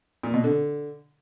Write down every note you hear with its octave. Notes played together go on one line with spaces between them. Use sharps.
A#2
B2
D3